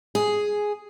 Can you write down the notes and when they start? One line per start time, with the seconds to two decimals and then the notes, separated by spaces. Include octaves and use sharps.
0.15 G#4